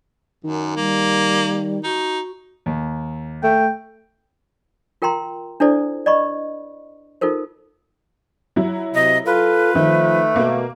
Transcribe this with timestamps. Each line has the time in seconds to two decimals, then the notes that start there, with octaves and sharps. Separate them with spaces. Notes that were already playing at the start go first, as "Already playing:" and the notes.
0.44 F#2 D#3
0.76 G3 A#3
1.84 D#4 F#4
2.66 D#2
3.43 A3 G5
5.02 F4 A#4 G5 A#5 C6
5.60 D4 E4 A4 C5 D5
6.06 D5 D#5 B5 C#6
7.21 D#4 F4 A4 A#4 C5
8.56 F#3 E4
8.95 C3 D#5
9.26 F4 A4 B4
9.75 D#3 F3 A3
10.36 B2 A#3